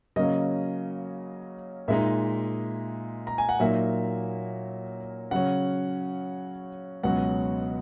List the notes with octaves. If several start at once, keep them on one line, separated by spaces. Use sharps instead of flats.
C#3 F#3 A#3 C#4 D#5
A#2 G#3 D#4 E5
A#5
G#5
F#5
A#2 F#3 A#3 D#4 E5
C#3 F#3 C#4 F#5
C#2 B2 F#3 C#4 F#5